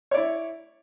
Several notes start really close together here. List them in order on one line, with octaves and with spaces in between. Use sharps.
C#5 D5 E4